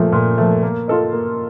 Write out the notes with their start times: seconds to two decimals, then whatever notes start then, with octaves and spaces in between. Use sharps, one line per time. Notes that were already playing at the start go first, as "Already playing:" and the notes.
Already playing: A#2 F3 A3
0.12 A#2
0.38 F3 A3
0.63 A#3
0.88 F4 A4 D#5
1.13 A#3